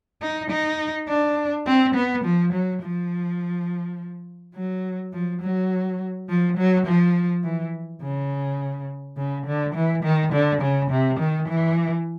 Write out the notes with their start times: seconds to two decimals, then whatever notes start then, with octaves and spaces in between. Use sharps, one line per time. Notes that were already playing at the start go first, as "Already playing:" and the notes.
0.22 D#4
0.51 D#4
1.08 D4
1.66 C4
1.95 B3
2.24 F3
2.53 F#3
2.82 F3
4.55 F#3
5.13 F3
5.42 F#3
6.29 F3
6.57 F#3
6.86 F3
7.44 E3
8.02 C#3
9.17 C#3
9.46 D3
9.75 E3
10.04 D#3
10.33 D3
10.62 C#3
10.90 C3
11.19 D#3
11.49 E3